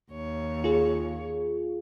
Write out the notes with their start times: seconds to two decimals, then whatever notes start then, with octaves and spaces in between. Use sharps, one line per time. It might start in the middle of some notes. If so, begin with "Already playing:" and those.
0.11 D#2 C#5
0.64 F4 G#4